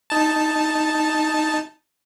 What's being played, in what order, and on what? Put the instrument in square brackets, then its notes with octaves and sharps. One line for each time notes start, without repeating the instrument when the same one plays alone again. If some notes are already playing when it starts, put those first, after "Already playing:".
[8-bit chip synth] D#4 A5